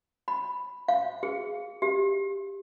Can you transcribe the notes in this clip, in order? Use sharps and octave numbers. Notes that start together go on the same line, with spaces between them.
B5
F5
G#4
G4